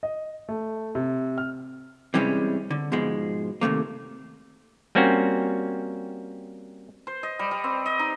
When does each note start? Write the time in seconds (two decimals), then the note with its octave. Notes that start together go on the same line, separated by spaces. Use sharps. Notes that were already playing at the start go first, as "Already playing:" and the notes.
0.03 D#5
0.49 A3
0.95 C3
1.38 F6
2.14 C3 E3 G3 G#3 C#4
2.71 D3
2.92 G#2 B2 F3 G#3
3.61 D#2 C3 A3 A#3
4.95 G3 A#3 C4 C#4 F#4
7.07 C5
7.23 D#5
7.39 G3
7.51 G3
7.64 C4
7.86 D#5
7.99 D#4